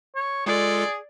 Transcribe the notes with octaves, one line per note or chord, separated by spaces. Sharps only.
C#5
G#3 F4 G#4 A4 D5